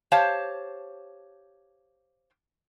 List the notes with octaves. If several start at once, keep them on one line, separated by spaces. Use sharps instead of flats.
G4 C5 C#5 F5 A5